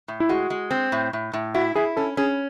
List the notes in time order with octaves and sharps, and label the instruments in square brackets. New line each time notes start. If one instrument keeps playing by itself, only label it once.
[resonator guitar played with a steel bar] A2
[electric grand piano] E4
[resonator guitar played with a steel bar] G#3 [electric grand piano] F#4
[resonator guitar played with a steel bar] G#3
C4
A2
A2
A2
[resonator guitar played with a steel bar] E4 [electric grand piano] F#4
[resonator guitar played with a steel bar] E4 [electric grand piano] G#4
[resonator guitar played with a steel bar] C#4 [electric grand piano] A4
[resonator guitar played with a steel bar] C#4 [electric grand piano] G#4